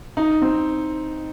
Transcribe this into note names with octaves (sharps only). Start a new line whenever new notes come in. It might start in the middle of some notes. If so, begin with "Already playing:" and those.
D#4
C4